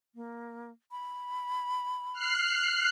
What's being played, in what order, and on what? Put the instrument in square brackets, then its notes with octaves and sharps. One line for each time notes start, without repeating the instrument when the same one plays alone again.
[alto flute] A#3
B5
[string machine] F6 F#6 C7